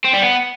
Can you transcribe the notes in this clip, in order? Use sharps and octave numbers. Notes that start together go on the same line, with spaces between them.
C4
G3
B3